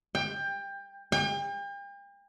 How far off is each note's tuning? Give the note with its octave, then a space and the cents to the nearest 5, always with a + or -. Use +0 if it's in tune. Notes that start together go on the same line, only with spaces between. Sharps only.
G5 +20
G5 +40